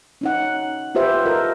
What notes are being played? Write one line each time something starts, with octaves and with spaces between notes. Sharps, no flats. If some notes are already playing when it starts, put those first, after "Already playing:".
C#4 D#4 F#5
F4 G4 B4 C5 E5
F4 A4 A#4 D#5